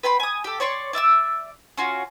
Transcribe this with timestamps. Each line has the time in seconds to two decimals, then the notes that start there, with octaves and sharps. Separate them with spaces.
0.03 B4 G5 B5 C6
0.20 G#5 D#6
0.44 G4 A4
0.60 C#5 D5 C6 C#6
0.93 D5 E5 D6 E6
1.77 C#4 F4 F#4